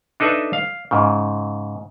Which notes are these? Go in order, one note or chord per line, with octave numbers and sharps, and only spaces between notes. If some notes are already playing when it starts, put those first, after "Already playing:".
D4 D#4 A4 B4 D#5 E5
F5
G#2 C#3